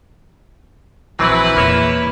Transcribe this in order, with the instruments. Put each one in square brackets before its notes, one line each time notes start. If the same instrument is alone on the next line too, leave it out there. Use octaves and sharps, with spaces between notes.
[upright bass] A#1 [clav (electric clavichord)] E3 F#3 C4 [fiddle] E4 [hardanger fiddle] B4
[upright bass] E2 A#2 [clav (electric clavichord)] A#3 C#5 E5